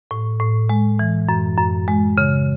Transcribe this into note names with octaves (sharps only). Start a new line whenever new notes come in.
A2
A2
G#3
E3
F#2
F#2
G#3
C#3